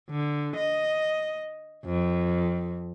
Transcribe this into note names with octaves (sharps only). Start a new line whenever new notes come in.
D3
D#5
F2